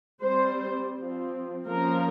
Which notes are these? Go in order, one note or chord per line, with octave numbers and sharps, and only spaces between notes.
G3 C4 C5
F3 C4
F3 A#3 C#4 A#4